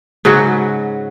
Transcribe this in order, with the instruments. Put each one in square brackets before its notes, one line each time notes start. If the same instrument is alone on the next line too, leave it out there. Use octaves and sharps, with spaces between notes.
[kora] G#2 C#3 F#3 F#4